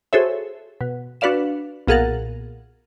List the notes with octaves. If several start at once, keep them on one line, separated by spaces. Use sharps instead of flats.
F#4 G#4 A4 C5 C#5 E5
B2
D4 F#4 B4 D5 F5 E7
B1 A#2 G#4 A#4 F#5 A6